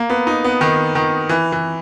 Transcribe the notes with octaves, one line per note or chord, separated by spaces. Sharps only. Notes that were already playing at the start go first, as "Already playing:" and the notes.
Already playing: A#3
B3
D#4
B3
D#3
D#3
E3
E3